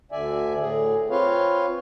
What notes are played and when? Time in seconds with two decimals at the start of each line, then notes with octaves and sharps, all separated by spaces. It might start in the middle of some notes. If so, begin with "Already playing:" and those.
0.12 D2 D3 D5 E5 G#5
0.61 A2 G#4
1.10 C4 F4 B4 C#5 F5